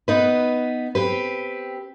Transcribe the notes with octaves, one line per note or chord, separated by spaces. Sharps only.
B3 D#4 B4
C4 G4 B4